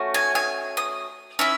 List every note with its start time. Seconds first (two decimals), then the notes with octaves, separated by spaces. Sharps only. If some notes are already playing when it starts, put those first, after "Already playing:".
Already playing: A3 C#4 F#4
0.14 G#5
0.35 G#5
0.77 D#6
1.39 C#4 E4 E5